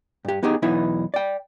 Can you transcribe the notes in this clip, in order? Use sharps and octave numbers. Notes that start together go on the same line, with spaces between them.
G2 G4
B3 D#4 G4 G#4
B1 E2 B3 D#4 E4
D5 G5